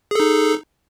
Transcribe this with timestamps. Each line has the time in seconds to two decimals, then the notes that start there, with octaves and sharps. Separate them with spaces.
0.11 G#4
0.15 A4
0.20 D#4